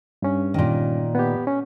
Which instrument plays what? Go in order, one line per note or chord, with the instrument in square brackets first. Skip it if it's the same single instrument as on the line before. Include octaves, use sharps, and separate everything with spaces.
[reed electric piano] G2 C#4
[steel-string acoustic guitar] A#2 D#3
[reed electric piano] B3 G4
C#4